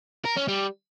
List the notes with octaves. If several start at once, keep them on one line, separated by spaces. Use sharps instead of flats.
A#4
C#4
G3